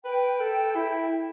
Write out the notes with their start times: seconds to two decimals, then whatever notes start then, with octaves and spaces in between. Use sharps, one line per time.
0.04 B4 G5
0.40 A4
0.75 E4